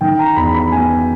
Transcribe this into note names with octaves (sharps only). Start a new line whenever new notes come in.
D#3 G5
A#5
E2 B5
B5
B3 G#5